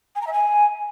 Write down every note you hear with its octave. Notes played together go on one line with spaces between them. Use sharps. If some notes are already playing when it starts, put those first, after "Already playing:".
G#5
A#5
E5
G#5